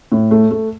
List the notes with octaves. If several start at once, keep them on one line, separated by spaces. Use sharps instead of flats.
A2
A3
A3